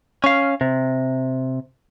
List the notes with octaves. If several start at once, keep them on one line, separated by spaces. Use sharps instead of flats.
C#4 F5
C3